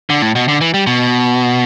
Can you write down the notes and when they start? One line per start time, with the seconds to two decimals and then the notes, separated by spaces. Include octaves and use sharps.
0.10 D3
0.22 A2
0.35 B2
0.48 D3
0.61 E3
0.74 G3
0.87 B2